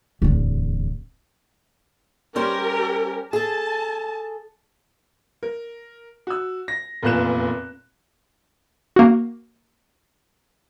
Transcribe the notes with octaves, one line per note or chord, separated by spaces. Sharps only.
D1 E2
G3 C#4 G4 A#4 C5
G#4 A4 A5
A#4
F#4 E6
A#6
F1 E2 A#2 F4 F#6 E7
A#3 F#4